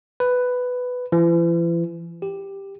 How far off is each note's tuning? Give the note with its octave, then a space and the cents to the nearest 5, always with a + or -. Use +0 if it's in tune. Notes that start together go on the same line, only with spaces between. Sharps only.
B4 +10
E3 +40
G4 +5